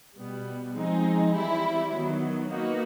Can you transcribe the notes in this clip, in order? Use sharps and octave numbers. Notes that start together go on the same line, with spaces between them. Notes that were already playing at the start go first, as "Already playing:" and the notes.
B2 G3 B3
F3 G#3 C4 D#4 G#4
E3 G3 C4 E4
D#3 F#3 B3
A#3 D#4 F#4 B4